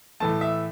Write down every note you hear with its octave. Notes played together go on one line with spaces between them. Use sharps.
A2 E3 A3 A5
E5